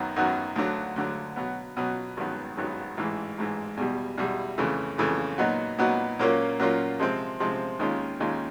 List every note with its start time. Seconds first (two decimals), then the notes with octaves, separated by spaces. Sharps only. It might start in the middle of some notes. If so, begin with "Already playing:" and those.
Already playing: F#2 D#3 F#3 B3
0.16 F#2 D#3 F#3 B3
0.56 D2 D3 F#3
0.96 D2 D3 F#3
1.36 B2 F#3 B3
1.77 B2 F#3 B3
2.17 G#1 G2 D#3 F#3 B3
2.57 G#1 G2 D#3 F#3 B3
2.97 A1 G#2 E3
3.38 A1 G#2 E3
3.77 E2 B2 G3
4.18 E2 B2 G3
4.58 F2 C#3 E3 A3
4.98 F2 C#3 E3 A3
5.38 A#2 F#3 B3 D#4 F#4
5.78 A#2 F#3 B3 D#4 F#4
6.19 A#2 F#3 A#3 C#4 F4
6.60 A#2 F#3 A#3 C#4 F4
7.00 C3 F3 G#3 C4
7.40 C3 F3 G#3 C4
7.79 D#2 D#3 G#3 C#4 F4
8.20 D#2 D#3 G#3 C#4 F4